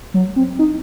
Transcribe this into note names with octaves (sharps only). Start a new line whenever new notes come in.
F#3
C4
D#4